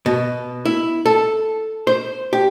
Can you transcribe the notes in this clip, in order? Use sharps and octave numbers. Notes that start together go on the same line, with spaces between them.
B2
E4
A4
C5
G4